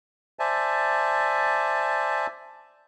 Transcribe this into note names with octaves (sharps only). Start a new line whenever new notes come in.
C5 D5 E5 G#5 A5